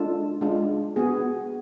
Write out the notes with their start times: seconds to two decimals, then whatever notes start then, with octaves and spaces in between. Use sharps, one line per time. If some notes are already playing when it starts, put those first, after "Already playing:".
Already playing: G#3 D4 F4 A4
0.41 G#3 D4 F4
0.96 B3 F#4 G#4